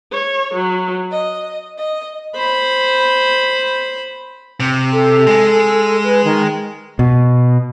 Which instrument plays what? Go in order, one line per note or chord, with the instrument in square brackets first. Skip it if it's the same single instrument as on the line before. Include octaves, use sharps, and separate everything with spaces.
[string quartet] C#5
F#3
D#5
D#5
[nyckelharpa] C5 B5
[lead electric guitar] C3
[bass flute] A4
[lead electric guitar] G#3 G#4
[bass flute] B4
D#3
[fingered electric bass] B2